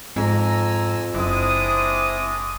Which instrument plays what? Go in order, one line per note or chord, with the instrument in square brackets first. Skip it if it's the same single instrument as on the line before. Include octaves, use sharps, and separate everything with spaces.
[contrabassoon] F2 [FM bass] G#2 [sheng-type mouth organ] G#5 E6 [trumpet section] A#5
[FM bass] F#1 [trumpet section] G#3 D4 D#6 [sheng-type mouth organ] C4 E4 D6